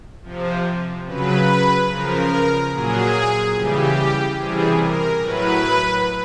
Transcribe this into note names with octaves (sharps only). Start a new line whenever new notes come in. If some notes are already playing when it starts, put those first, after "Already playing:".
C3 F3
C#3 F#3 B4
C#3 F3 A#4
A#2 F#3 G#4
C#3 E3 G3 G4
C3 E3 G3 G#4
A#4
A2 F#3 B4